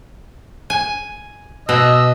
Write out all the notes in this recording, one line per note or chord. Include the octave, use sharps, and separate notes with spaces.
G#5
B2 D#5 E6